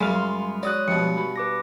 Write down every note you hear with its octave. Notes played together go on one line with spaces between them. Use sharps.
F#2 C#3 G3 G#3 B3 F5
C6
F#4 C#5 D5 D#6 F#6
G2 B2 F3 C#7
F#4 B5
B4 D6 A#6